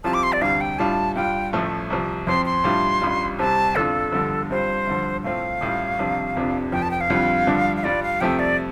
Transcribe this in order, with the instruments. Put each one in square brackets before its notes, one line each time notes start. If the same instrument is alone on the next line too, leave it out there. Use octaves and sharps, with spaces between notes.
[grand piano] C2 C3 F3 C4 F4 [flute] A5
[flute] D6
C6
D5
[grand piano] D2 C3 G3 D4 [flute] F5
[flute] G5
[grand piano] A2 G3 D4 F4 [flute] A5
[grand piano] G2 G3 F4 [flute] G5
[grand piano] A1 A2 F3 A3
C2 C3 F3
[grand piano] F2 F3 C4 [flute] C6
[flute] C6
[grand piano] A2 G3 D4 F4
A1 G2 G3 F4
[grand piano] C2 C3 G3 C4 [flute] A5
[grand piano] G1 F2 F3 D4 F4 [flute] A4
[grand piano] G1 G2 D3 F3
[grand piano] G2 G3 C4 F4 [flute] C5
[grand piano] G2 D3 F3
[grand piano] A2 A3 C4 F4 [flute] F5
[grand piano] A1 A2 G3 F4
C2 C3 F3 D4 F4
F1 F2 C3 F3 D4
[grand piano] F1 F2 F3 [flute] G5
[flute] A5
G5
F5
[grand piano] F2 D3 G3 F4
G2 D3 F3 D4
[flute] F5
[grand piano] G2 G3 F4 [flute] D5
[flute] F5
[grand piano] F2 C3 F3 A3 [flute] G5
[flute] D5